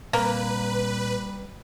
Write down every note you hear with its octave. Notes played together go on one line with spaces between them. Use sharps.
A#2 G3 A#3 C4 B4